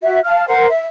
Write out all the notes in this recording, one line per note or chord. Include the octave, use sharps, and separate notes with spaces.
F#4 E5
F5 A5 F6
A#4 C5 F#5
E5